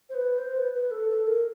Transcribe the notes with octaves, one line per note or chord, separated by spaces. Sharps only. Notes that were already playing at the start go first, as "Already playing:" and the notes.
C5
B4
C5
B4
B4
A4
A4
A#4